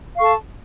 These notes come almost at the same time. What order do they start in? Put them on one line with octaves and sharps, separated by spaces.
F5 C#6 A4 A5